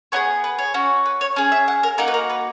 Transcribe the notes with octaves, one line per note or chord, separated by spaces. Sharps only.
B3 D#4 G#4 C#5
B4
C#5
C#4 F#4
B4
C#5
C#4 G#4
E5
F#5
A#4
A#3 D#4 F#4 A#4
B4
A#4
B4